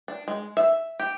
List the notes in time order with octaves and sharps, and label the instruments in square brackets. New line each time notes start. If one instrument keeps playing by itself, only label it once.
[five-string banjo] D4
G#3
E5
G4